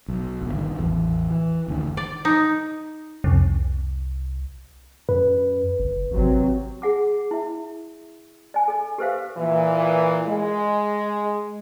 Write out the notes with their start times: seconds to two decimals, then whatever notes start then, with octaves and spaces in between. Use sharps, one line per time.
0.08 B1
0.41 G1 A#2
0.54 G2 D#3
0.79 A1 E2
1.30 E3
1.68 F#1 D2 D#3
1.97 D5
2.25 D#4
3.24 C2 F2 C3
5.09 F#2 B4
5.79 F#1
6.11 G#1 C3 F#3 C4
6.82 G#4 F#5 D6
7.31 E4 E5
8.54 D5 G#5
8.68 A4 D5
8.98 G4 A4 B4 C5 E5 F5
9.37 A#2 E3
10.28 G#3